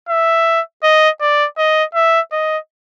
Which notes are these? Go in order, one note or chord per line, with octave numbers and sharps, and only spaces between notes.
E5
D#5
D5
D#5
E5
D#5